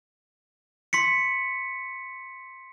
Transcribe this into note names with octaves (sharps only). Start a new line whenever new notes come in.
C6 B6 C#7